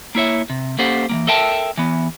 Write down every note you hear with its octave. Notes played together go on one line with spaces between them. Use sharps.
A#3 E4 C#5 E5
C3
A#3 C#4 G4 A4 C5 F#5
E3 F#3 A#3
A4 A#4 E5 G5 A5
E3 B3